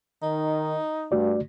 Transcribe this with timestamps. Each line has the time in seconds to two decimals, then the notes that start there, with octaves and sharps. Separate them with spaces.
0.22 D#3 D#4
1.12 G2 A3 F#4 D5